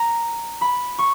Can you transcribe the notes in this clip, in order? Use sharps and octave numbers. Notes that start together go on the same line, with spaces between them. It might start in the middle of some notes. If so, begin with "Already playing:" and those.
Already playing: A#5
B5
C#6